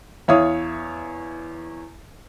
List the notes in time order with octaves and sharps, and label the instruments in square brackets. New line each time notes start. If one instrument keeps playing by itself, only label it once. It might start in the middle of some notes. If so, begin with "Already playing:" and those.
[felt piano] E2 C#5 E5 F5 D#6